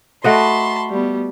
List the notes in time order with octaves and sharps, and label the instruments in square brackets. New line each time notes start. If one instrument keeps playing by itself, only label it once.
[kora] A3 F#4 D#5 [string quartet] A5 B5 C6
[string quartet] G3 B3